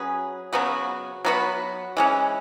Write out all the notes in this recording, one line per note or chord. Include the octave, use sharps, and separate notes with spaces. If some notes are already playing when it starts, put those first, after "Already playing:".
Already playing: F#3 C#4 G#4 B4
C#3 F#3 B3 F#4
F#3 B3 F#4 B4
E3 G#3 C#4